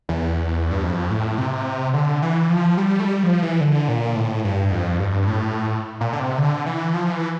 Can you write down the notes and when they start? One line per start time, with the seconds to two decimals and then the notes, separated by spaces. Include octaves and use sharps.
0.09 E2
0.71 G2
0.83 F2
1.11 A2
1.38 C3
1.94 D3
2.22 E3
2.50 F3
2.77 G3
3.00 A3
3.05 G3
3.23 F3
3.42 E3
3.61 D3
3.88 A#2
4.15 A2
4.44 G2
4.72 F2
4.99 G2
5.27 A2
6.01 A#2
6.13 D3
6.20 C3
6.38 D3
6.66 E3
6.94 F3
7.12 E3